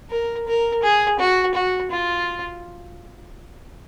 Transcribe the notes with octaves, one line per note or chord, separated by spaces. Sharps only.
A#4
A#4
G#4
F#4
F#4
F4